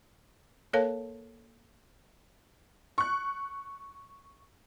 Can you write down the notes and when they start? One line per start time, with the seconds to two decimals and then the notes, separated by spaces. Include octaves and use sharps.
0.73 A#3 A4 A#4 C#5 F5 A5
2.98 C#6 F#6